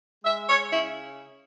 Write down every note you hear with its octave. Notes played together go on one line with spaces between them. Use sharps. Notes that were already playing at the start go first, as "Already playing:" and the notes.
G#3 E5
C#5
C#3 E4